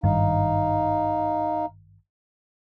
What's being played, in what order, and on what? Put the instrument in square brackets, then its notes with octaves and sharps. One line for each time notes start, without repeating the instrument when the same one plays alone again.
[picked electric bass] G#1 G2 D#3 [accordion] D#4 F5